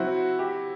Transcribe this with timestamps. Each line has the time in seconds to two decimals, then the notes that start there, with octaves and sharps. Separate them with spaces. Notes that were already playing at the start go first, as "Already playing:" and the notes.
Already playing: F#3 C4 E4 F#4
0.39 G4